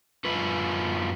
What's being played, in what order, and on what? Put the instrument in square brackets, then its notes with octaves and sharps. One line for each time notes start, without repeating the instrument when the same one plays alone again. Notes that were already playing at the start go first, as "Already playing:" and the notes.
[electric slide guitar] F#2 F4 B4